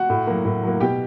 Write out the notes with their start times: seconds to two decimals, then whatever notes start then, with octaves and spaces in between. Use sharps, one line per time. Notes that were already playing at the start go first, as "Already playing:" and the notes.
Already playing: F#4 F#5
0.10 A2
0.27 F#3 A#3
0.45 A2
0.63 F#3 A#3
0.80 B2 G4 G5